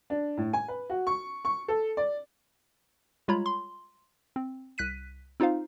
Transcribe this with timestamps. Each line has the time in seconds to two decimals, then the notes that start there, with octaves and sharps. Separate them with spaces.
0.10 D4
0.37 A2
0.53 G#5
0.68 B4
0.90 F#4
1.07 C#6
1.45 C#6
1.68 A4
1.97 D5
3.28 G3 G#3 F4 C#5 A#5 B5
3.46 C6
4.36 C4
4.78 C2 F#6 B6 D#7
5.40 C4 D#4 F4 C5 F5